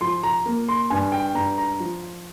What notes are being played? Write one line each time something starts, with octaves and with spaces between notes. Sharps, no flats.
F3 C6
A#5
A#3
C6
G2 G#5
G5
G2 A#5
A#5
F3